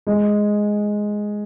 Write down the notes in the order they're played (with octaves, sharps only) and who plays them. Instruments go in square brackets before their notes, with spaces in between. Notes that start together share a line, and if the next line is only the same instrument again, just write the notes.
[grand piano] G#3